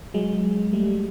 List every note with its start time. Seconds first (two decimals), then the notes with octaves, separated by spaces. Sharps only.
0.14 F#3 G#3
0.73 G3 A3